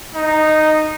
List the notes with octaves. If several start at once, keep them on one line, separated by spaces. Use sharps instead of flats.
D#4